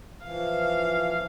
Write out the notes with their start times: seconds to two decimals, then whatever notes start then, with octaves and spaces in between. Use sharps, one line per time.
0.22 E3 F3 F5